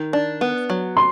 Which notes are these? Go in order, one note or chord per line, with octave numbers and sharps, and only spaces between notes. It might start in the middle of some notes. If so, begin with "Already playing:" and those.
Already playing: D#3
D4
B3
F#3
C6